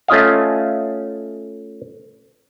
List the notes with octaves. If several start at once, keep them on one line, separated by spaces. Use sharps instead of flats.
A3 C#4 F4 D#5 F5